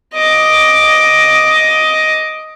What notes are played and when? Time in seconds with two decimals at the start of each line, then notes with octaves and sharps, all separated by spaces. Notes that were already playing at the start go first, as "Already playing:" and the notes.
0.14 D#5 D6